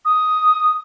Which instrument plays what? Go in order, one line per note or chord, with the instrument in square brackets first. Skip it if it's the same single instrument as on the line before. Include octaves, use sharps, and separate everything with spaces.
[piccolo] D#6